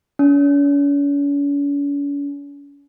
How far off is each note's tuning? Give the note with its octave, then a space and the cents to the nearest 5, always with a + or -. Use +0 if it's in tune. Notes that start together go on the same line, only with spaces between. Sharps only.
C#4 +45